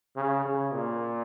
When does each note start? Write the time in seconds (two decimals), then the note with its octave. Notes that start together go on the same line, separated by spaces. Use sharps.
0.16 C#3
0.45 C#3
0.72 A#2